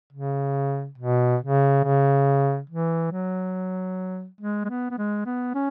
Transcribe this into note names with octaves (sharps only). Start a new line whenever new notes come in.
C#3
B2
C#3
C#3
E3
F#3
G#3
G#3
B3
B3
G#3
B3
C#4